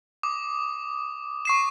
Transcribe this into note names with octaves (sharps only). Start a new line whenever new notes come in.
D6 D#6
C#6 C7 E7